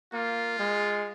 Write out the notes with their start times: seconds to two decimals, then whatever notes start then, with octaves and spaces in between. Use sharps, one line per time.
0.13 A#3 F4
0.59 G#3